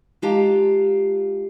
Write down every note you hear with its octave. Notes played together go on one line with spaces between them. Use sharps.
G#3 F4 G4 F5 A5 A#5